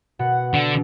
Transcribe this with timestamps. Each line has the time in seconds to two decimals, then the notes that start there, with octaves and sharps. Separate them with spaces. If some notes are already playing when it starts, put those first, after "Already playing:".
0.19 B2 F#5
0.54 D3